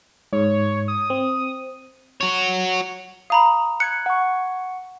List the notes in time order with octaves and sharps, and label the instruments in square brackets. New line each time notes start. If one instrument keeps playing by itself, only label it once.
[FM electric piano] G#2 [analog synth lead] C#5
[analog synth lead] D#6
[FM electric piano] C4
[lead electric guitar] F#4 C#5
[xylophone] F5 A#5 B5 [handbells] D#6
[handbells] F#6 G#6 [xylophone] C#7
[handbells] F#5 C#6